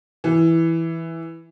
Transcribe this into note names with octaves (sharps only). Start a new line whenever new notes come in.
E3